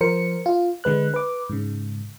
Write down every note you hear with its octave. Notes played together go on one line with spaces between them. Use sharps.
F3 A#4 C5 C#7
F4
D3 G#3 B4 F#6
B4 D6
G#2 C#3